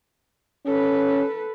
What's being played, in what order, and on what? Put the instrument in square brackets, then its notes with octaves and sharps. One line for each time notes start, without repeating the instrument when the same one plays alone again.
[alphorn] C#4 [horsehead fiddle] A4 B4